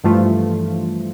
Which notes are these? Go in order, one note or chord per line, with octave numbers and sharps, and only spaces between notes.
G2 E3 F3 A3 F4